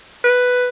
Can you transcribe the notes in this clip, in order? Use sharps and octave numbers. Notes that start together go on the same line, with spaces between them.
B4